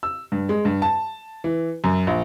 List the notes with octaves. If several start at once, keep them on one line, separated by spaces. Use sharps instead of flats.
E6
G2
G#3
G2
A5
E3
F#2
A#1